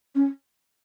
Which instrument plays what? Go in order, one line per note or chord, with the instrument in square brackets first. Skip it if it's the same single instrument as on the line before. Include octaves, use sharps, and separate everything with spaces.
[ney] C#4